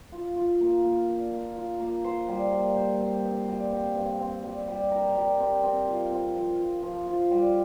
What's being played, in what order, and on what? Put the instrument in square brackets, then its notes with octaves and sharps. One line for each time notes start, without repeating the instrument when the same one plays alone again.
[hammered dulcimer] F4
F4
A#3
A#3
D4
A#3
F4
A#3
C5
G3
A#3
C5
C4
G2
G3
C4
G2
C4
G3
G3
A#4
G3
C4
C4
F4
C4
F3
F4
F3
F4
G3